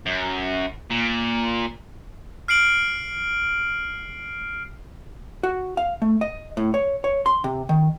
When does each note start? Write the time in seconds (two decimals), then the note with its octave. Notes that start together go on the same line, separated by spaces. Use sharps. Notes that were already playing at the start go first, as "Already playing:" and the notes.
0.06 F#2
0.90 A#2
2.48 F6 C7 D7 F#7
5.43 F#4
5.77 F5
6.02 A3
6.21 D#5
6.57 A2
6.74 C#5
7.04 C#5
7.26 C6
7.44 C3
7.69 D#3